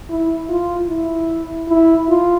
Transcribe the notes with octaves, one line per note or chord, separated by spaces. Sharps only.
E4
F4
E4
E4
F4